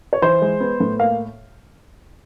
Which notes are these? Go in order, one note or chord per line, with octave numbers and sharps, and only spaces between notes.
C#5
E3 C5
G#3
B3
A2
A#3 F5